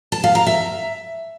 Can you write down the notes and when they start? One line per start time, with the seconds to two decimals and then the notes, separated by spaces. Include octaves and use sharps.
0.12 A5
0.24 F5
0.35 A#5
0.47 E5